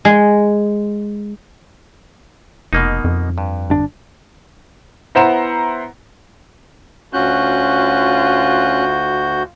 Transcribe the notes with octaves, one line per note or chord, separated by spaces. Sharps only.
G#3
F1 B2 A#3 D#4
F2
G2
G1 D4
B3 E4 C5 F#5 A#5 E7
D2 C#4 F4 F#4 F#6 G6